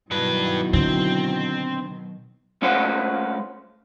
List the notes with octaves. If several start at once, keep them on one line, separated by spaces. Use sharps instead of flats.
G2 B2 D#3 F#3 E4 F#4 B4
D3 C4
G#3 A3 C#4 F4 C5 F#5